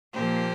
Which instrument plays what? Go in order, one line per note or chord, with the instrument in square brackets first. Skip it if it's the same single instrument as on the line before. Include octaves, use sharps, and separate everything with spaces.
[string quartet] A#2 F3 A#3 G4 C5